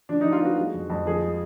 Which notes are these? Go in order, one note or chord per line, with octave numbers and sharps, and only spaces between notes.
F3 D4
D#4
F3
F4
B3 F#4
G#3
F2
F2
F3 G#4
G#3